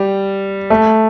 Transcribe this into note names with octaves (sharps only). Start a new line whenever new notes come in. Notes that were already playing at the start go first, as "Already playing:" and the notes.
Already playing: G3
A3